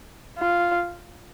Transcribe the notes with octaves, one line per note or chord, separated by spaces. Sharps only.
F4